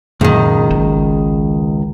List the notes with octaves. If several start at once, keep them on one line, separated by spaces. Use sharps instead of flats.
C#2 F#2 A#2 D#3
G#1